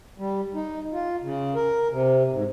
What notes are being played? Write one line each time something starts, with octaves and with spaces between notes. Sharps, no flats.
G3
D#4
F4
C#3
A#4
C3
G#2